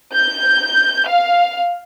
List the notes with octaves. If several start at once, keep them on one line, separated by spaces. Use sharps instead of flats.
G6
F5